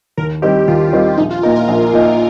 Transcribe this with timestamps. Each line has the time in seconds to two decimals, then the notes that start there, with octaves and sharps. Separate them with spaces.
0.17 D#2 A#4
0.42 D#3 G3 C4 D#4 G4
0.68 D#2 F4
0.93 D#3 G3 C4 D#4
1.18 A#1 D#4
1.31 F4
1.43 A#2 A#3 D#4 A#4
1.56 A#4
1.68 A#1
1.93 A#2 A#3 D#4